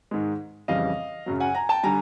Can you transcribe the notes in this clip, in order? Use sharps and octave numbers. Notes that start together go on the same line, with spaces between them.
G#2 D#3 G#3
F2 C#3 E3 G3 D#5 F5
F#2 C#3 F#3
F#5 G#5
G#5 A#5
G5 A5
D3 G3 G#5 A#5